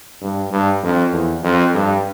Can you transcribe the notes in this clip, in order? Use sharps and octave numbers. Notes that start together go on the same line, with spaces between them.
G2
G2
F2
E2
F2
G2